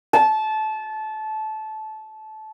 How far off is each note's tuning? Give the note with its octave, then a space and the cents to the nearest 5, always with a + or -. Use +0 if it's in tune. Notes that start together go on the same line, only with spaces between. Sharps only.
A5 -20